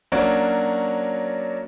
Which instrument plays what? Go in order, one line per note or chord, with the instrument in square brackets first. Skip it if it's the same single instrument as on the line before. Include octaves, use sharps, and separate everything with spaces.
[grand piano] F#3 A#3 C#4 D4 F#4